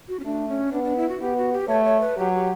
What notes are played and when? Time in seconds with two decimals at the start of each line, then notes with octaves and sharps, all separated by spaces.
0.08 F#4
0.20 C#4
0.25 A3 D4
0.49 C#4
0.72 B3 D4
0.84 D4
0.97 E4
1.09 F#4
1.21 B3 G4
1.37 F#4
1.53 G4
1.68 A3 C#5
1.85 C#5
2.00 B4
2.18 F#3 G4
2.33 G4